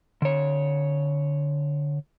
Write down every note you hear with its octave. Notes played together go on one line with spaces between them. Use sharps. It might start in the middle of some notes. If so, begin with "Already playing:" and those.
D3 C#5